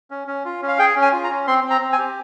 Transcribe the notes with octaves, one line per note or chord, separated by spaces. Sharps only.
C#4
C#4
F4
C#4
F5
G#4 G5
C#4
G#5
F4
A#5
C#4
C4 C6
C4
A#5
C4
G#5
G4